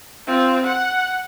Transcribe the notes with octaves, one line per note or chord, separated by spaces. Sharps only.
C4 F4
F#5